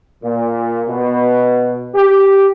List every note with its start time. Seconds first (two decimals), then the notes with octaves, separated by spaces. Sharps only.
0.23 A#2
0.89 B2
1.94 G4